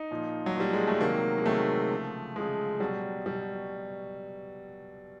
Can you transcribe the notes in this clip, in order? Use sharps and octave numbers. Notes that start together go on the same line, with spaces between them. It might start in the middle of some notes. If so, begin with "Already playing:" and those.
Already playing: D#4
A#2 F3
F#3
A#2 F3 G3
G#3
A3
C3 D#3 F#3 A#3
G#3
C3 D#3 F#3 A3
C#3 F3
C#3 F3 G#3
B2 F#3 G3
B2 F#3 G3